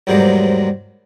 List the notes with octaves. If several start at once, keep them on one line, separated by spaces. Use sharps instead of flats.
E2 G#2 C3 F#3 G3 A#3